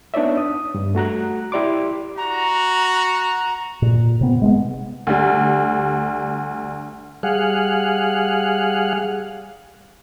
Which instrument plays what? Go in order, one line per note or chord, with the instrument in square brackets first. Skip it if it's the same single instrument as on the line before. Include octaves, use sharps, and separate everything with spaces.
[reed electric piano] B3 D4 D#4 C#5 D5 E5
D#6
G2
A3 F#4 A#5 F#6
E4 G4 D5 C6 D6
[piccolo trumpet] F#4 [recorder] A#5
[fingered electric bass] A#2
C3 B3
G#3 A#3 B3
[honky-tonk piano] D2 G3
[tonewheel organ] G3 G#4 F5 F#5